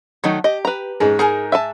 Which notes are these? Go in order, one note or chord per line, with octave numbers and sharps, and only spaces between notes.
D#3 F#3 A3 D#4
G4 D#5
B4 A#5
G#2 G#3 C#4
D#4 G#4 A#4 G#5
E5 G#5 A5